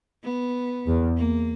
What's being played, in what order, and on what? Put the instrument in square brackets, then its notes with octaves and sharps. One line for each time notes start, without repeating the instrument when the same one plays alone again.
[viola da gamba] B3
[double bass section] E2
[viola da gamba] A#3